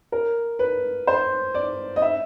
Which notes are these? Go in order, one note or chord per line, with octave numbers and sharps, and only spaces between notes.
A#4
B4
C5
D5
D#5
E5